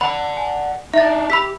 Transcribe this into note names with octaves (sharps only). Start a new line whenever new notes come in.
D5 F#5 B5
G#5
D4 D#4 E5 A6
G4 B5 E6 B6